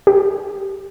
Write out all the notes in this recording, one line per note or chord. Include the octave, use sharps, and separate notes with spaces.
G4